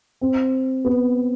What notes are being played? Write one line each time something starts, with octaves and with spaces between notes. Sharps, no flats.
C4
B3